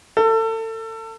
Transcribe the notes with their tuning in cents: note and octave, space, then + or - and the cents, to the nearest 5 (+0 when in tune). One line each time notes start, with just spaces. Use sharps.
A4 +30